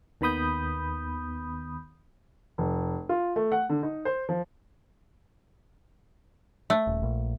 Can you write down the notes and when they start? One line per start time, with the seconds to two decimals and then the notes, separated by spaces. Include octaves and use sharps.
0.21 D#2 D#3 B3 B5 D#6 G6
2.58 F1
3.09 F4
3.36 A3
3.52 F#5
3.69 D3
3.83 D#4
4.05 C5
4.29 F3
6.70 A3
6.87 D#1
7.03 A#1